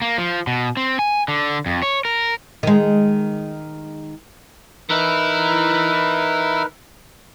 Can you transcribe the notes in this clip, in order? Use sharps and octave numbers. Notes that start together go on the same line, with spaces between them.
A#3
F3
B2
C4
G#5
D3
F2
C#5
A#4
D#3 G#3
E3 D#4 E4 A#4 B4